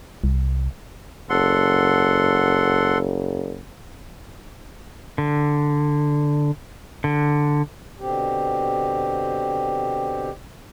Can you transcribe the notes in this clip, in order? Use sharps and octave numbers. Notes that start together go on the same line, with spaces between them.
C2
F#1 A4 F#5 C6
D3
D3
B2 D3 C4 G4